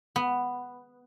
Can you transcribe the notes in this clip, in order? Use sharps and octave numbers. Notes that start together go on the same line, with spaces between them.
B3